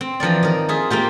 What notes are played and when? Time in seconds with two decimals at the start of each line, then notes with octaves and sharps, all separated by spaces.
0.01 C4
0.20 E3 F3 A#4 D5
0.43 D#3 A#4
0.69 F4 G#4 E5
0.90 A#3 C4 F4 G4